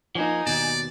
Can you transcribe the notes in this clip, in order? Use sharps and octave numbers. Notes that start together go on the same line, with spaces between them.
F3 A#3 D#4 G#5
D#2 B2 D5